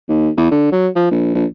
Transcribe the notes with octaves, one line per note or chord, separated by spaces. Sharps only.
D#2
E2
D3
F#3
F3
A#1
A#1